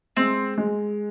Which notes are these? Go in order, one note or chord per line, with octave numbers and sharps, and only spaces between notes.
G#3 C4
G#3